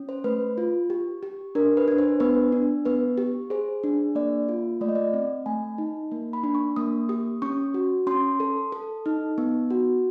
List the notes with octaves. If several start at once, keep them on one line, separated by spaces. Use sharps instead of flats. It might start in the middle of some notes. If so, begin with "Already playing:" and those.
Already playing: C#4
C5
A3 B4
F4
G4
G4
D4 A#4
B4
D4
C5
B3 B4
D4
B3 B4
G4
G#4 C5
D4
A#3 D5
F4
A3 D5
D#5
D5
C4
A3 G#5
D#4
A#3
B5
D4
C#6
A#3 D#6
G4 D#6
C#4 C#6
F#4
C#4 C6
A4
A4
D#4
B3
F#4